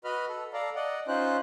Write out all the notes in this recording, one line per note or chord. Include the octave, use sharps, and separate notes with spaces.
F#4 B4 D#5 B5 F6
A4
A4 D5 F5 A#5
D5 D#5 F#5
C#4 D#4 F4 C5 F#6